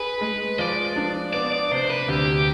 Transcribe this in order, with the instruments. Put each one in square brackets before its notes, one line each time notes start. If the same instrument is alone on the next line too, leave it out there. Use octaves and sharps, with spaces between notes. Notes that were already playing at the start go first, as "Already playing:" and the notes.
Already playing: [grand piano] G#4 [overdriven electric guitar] B4
[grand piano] G#3
[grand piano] F3 [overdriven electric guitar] D5
[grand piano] D4
[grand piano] B3 [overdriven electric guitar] D5
[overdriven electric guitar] D5
[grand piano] C3 [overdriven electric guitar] C5
[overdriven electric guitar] B4
[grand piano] D2 [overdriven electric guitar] G4